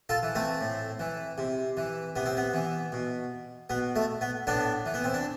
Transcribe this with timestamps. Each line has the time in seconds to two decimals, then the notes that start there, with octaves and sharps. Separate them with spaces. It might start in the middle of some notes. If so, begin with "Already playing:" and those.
0.09 F4 A4
0.23 E3
0.35 A3 C4
0.61 A2
0.99 E3
1.38 C3
1.77 E3
2.16 C3 B3
2.26 C4
2.37 B3
2.54 E3
2.92 B2
3.70 B2 B3
3.96 A3
4.21 B3
4.47 A2 B3 D4
4.86 E3
4.94 B3
5.04 C4
5.14 D4